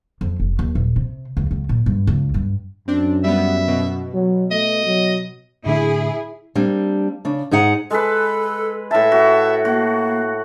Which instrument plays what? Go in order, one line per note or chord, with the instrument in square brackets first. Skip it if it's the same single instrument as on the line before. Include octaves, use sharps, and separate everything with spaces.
[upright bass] F2
F1
D#2
D#1
C3
C#2
C#2
A#2
G2
C#2
G2
[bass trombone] F#2 [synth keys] C4 D4
[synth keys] G3 B3 [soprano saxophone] E5
[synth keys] B2
[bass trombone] F#3
[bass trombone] A3 [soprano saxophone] D#5
[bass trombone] F#3
[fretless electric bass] A2 D3 A3 [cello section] E4 G#4
[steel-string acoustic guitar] G3 A#3 C4 D4
C#3 D4
G#2 D#4 G#4 F#5 A5 A#5
[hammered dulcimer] G#3 B4 [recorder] A4
[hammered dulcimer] A2 A5 [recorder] E5
[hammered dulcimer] F#4
[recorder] A#3 [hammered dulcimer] F#4